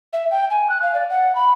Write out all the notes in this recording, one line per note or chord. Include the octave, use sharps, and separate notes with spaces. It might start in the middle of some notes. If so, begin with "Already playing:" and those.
E5
G5
G#5
F#6
F5
D5
F#5
B5